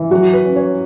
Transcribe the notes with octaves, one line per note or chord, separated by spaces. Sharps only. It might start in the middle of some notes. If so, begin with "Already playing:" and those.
Already playing: E3
F#3 F#4
B4
C#4
C#5